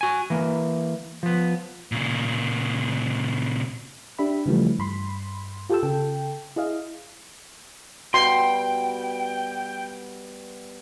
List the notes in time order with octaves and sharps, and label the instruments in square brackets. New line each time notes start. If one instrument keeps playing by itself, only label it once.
[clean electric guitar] F#4 G#5
E3 A#3
F3 B3
[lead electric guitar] A#2 C#3
[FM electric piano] D4 G4 E5 B5
C#3 E3 F3 G3 A3
G2 B5 C6
F4 G4 A4 G5 A5 E6
C#3 A4 G5
E4 G#4 D#5 F5
[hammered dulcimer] B2 G3 [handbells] F#4 [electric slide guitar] G5 [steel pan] C6